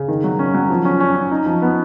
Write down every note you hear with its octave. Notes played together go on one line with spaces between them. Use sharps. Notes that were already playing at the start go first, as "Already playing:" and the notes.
Already playing: C#3
D#3
F#3
C#4
F#3
F3
C#4
C#4
C#4
D#4
F3
B3